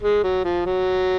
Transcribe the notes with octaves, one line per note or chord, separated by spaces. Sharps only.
G#3
F#3
F3
F#3